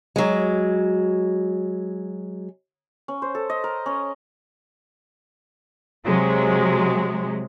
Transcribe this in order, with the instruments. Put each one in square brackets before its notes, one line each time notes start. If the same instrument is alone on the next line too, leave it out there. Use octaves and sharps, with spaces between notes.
[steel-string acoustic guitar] F#3 G#3
[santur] C#4
C5
A4
D#5
A#4
C#4
[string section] C3 F#3 G#3